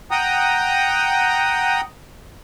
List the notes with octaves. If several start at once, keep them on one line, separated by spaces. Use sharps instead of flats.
F#5 G5 A#5 D#6